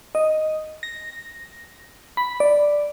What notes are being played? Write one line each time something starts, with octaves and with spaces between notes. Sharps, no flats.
D#5
A#6
B5
D5